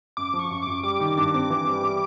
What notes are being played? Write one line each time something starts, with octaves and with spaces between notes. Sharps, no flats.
F#2 D6
F3
C#6
F#2
F#2 D6
G3 D6
D#3
G2
C4
E3
G3
G3